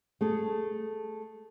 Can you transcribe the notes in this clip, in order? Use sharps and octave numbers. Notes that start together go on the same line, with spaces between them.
A3 G#4 A4